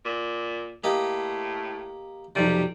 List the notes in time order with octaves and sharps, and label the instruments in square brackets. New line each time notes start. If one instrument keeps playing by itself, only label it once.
[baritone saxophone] A#2
[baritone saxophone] A2 [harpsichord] A#3 G4 D#5
[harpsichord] B1 F2 C3 [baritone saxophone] G3